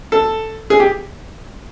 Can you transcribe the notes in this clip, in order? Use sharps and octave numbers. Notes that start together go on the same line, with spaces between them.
A4
G#4
G4